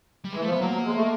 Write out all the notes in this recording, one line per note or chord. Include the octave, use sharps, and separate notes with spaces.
G3
E3 G#3
F3 A3
B3
F#3
A#3
F#3
G#3
A3